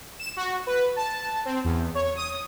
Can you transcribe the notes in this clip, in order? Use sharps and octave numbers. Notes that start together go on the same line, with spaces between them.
E7
F#4
B4
A5
C4
E2
C#5
D#6